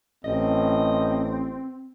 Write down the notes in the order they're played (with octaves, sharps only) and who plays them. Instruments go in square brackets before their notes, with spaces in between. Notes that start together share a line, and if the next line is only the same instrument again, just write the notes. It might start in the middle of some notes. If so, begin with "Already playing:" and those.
[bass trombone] A1 [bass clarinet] C4 [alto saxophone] D#5